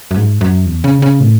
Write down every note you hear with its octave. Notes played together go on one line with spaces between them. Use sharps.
F#2
G#2
F#2
E2
C#3
C#3
A2